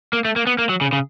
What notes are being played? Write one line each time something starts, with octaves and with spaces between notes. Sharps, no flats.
A#3
A3
A#3
B3
A#3
F#3
C#3
C#3